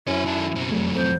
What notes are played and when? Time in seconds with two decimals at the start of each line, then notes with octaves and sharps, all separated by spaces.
0.07 F#2 C4 E4 C#5
0.25 D#3 A4
0.55 B2 C4
0.71 F1 F#2 A2
0.95 F2 C5